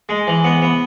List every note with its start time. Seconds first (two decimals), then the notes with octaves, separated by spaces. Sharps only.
0.09 G#3
0.27 E3
0.44 B3
0.62 B3